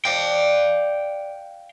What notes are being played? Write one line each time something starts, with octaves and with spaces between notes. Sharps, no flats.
D5 F5 G5